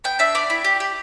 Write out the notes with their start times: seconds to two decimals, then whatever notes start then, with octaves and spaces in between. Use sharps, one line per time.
0.04 B3 G5
0.19 D4 E5
0.35 B3 D5
0.50 E4
0.64 G4
0.80 G4